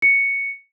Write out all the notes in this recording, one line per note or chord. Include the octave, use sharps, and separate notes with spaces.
C#7